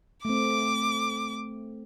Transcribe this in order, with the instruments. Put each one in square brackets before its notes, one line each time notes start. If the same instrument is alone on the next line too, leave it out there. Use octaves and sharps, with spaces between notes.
[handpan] A3 C4 [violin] D6